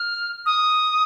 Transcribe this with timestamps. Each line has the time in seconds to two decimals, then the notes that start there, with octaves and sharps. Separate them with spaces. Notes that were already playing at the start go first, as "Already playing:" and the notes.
Already playing: F6
0.46 D#6